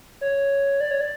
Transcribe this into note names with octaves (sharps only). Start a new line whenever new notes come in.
C#5
D5
C#5
D5